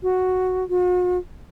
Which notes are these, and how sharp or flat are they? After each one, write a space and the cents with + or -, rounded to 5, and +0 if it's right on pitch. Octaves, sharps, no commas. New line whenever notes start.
F#4 +0
F#4 -45